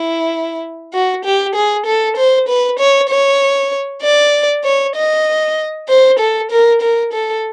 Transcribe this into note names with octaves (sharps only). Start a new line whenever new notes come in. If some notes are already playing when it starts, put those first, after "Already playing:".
Already playing: E4
F#4
G4
G#4
A4
C5
B4
C#5
C#5
D5
C#5
D#5
C5
A4
A#4
A#4
A4